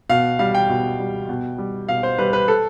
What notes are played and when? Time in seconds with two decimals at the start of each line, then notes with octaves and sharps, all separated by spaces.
0.09 B2 F5
0.39 G3 F5
0.55 G5
0.69 B2
1.00 G3
1.29 B2
1.58 G3
1.89 B2 F5
2.03 C5
2.18 G3 B4
2.33 B4
2.48 A4